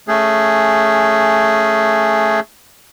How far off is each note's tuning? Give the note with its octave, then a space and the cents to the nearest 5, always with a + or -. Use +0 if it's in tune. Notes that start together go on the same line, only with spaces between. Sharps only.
A3 +0 C#4 +0 G#4 +0